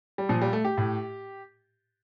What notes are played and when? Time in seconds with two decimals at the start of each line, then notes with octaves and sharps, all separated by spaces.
0.18 G3
0.29 A#2 F3
0.42 G3
0.53 A3
0.65 G4
0.78 A2